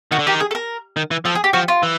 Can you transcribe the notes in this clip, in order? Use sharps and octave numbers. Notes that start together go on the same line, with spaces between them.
D#3 F#4
D3
D#3 G4
G#4
A4
A#4
D#3
E3
F3 A4
G#4
G4
F3 F#4
F4
E3